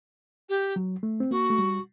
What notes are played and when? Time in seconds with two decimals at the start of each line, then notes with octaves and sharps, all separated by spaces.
0.49 G4
0.76 F#3
1.03 A3
1.20 C4
1.31 A#3 F#4
1.50 A3
1.58 G3